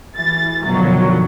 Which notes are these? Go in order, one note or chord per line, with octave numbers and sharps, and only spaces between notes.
E3 A6
F#2 B2 D3 D#3 F3 F#3